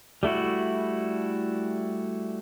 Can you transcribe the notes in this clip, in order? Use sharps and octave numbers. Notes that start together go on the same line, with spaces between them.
G3 A3 E4 F#4